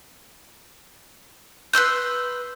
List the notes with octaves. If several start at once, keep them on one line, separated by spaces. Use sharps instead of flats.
B4 C6 E6 G6